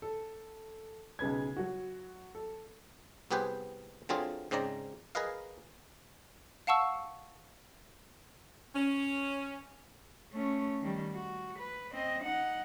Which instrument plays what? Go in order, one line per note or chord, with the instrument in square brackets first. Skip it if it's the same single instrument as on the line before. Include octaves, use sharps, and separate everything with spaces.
[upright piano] A4
B1 C#3 B4 G#6
F#3 F#4
A4
[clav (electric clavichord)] C2 B3 G4 G#4 B4 C5
D3 F#3 C4 F4 G#4
G#2 C#3 C4 D5 A#5
G#4 A#4 B4 D#5 F5
[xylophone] F5 F#5 A5 C#6 E6
[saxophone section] C#4
[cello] A3 C#4
D#3 G3
F#4
B4
C4 D#5
D#4 F#5